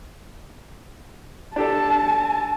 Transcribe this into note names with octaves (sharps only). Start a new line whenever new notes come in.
D4 G4 A4 A5